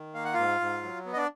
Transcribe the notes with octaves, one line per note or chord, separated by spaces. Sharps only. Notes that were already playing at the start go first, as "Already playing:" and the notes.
Already playing: D#3
A#3 F5
F#5
G#2 F4 F5
G#2
F#3
B3
D#5
D4 D5